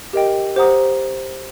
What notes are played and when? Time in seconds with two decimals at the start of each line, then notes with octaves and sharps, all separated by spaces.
0.13 G4 A#4 D#5 G5
0.56 G4 C5 F#5 A#5 D#6